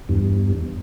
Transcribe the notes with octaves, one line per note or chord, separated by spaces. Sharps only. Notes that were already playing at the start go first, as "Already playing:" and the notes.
E2 G2